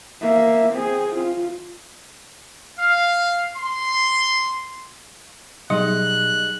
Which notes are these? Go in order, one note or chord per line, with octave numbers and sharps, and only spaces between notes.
A#3 E5
C4 G#4
F4
F5
C6
B2 F#3 G3 D#4 G#4 D#5 C6 F#6